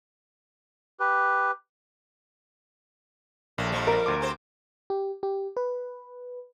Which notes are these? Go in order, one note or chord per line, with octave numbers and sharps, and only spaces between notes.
G4 B4
A#1 A2 A#3
F2 F3 G3
A#4
D2 C6 D6
C4 G4 C5
G4
G4
B4